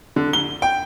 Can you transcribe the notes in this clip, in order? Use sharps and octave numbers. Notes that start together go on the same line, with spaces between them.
D3
G7
G5